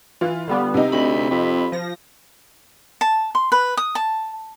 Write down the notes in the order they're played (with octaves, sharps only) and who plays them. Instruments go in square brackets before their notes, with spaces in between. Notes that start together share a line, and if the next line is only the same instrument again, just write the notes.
[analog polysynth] E3 [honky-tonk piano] F4
[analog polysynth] D3 G3 B3
[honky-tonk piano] C3 D#4
[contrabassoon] D2 [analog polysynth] B5
[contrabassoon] F2
[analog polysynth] F3 A#6
[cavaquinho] A5
C6
B4
D#6
A5